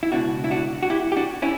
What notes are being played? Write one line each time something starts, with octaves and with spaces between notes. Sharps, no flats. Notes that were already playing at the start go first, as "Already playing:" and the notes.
E4
C#2 B2 D4 F#4
E4
D4 F#4
F#4
E4 G4
G4
D4 F#4
C#4 E4